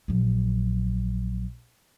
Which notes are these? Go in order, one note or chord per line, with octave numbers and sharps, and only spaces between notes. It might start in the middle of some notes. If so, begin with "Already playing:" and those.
A#1 F#3